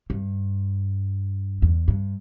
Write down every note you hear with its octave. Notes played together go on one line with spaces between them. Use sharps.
G2
E2
G2